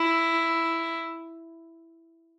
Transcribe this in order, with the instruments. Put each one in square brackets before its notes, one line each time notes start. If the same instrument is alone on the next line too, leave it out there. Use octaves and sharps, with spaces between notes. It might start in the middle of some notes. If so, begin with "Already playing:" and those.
Already playing: [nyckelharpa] E4